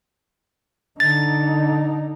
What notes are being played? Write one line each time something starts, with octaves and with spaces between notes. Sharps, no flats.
D3 D#4 A6